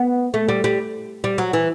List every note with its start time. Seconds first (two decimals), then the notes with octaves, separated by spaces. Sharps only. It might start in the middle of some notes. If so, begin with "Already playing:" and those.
Already playing: B3
0.34 A3
0.48 G3
0.64 G3
1.24 G3
1.38 F#3
1.53 E3